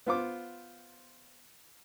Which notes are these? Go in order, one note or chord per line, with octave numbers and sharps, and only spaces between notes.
B3 F4 C5 D6